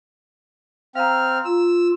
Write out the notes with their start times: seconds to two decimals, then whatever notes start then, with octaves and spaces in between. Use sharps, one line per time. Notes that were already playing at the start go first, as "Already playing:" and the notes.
0.95 C4 F5 A#5 F6
1.45 F4 E6